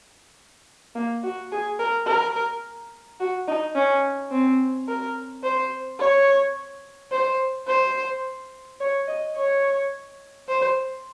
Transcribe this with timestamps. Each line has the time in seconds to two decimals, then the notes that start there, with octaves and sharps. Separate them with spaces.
0.95 A#3
1.23 F#4
1.52 G#4
1.80 A#4
2.07 A#4
3.20 F#4
3.48 D#4
3.75 C#4
4.31 C4
4.88 A#4
5.44 C5
6.00 C#5
7.12 C5
7.68 C5
8.80 C#5
9.07 D#5
9.37 C#5
10.48 C5